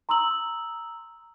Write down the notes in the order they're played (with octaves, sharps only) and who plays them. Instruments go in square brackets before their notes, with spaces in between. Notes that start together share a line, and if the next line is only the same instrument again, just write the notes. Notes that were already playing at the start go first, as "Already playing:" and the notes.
[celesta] A#5 C6 D#6 E6 F#7